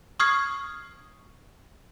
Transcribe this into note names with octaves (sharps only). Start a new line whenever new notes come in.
C#6 D#6 F6 G#6 C7